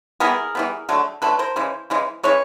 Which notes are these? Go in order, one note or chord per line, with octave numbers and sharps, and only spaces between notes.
E3 G3 B3 G#4 A#4
E3 G3 B3
D3 F#3 A3
D3 F#3 A3 A4 B4
A#4 C5
C#3 E3 G#3
C#3 E3 G#3
C#3 E3 G#3 C#5